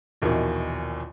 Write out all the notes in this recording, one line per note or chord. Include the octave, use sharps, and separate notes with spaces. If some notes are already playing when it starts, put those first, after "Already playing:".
A#1 D#2 B2 D#3 E3